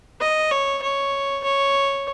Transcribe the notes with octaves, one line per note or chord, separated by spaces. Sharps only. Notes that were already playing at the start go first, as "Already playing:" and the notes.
D#5
C#5
C#5
C#5